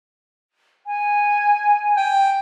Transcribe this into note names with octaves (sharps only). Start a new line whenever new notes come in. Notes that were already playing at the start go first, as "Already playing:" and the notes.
G#5
G5